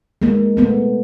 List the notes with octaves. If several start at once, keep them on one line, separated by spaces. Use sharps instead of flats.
G#3 A#3
A3 B3